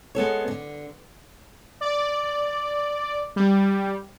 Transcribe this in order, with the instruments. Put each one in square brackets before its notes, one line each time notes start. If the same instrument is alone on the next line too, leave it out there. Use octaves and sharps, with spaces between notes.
[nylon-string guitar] G#3 B3 A4 C#5
D3
[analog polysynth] D5
G3